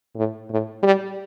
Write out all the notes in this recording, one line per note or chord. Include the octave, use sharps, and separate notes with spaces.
A2
A2
G3